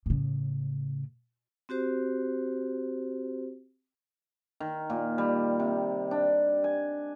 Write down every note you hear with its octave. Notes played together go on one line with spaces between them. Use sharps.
A2 C#3
C4 F#4 G4 C5
D#3
A#2
G3
C3
D4
G#5